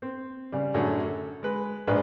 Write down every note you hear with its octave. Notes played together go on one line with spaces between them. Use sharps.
C4
C#3 G3
F#2 A2 D3 G#4 C#5
A4
G#3 B4
A#1 G#2 D4 G#4 B4